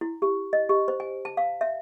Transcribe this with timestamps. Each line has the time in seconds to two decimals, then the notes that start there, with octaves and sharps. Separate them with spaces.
0.01 E4
0.22 G4
0.53 D#5
0.69 G4
0.88 C5
1.00 G#5
1.25 A5
1.37 F5
1.61 E5